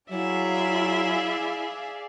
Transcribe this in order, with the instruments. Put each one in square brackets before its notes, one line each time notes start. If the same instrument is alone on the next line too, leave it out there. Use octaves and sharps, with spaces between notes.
[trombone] F#3 [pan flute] E4 [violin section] G#4 D5 F5 [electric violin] E5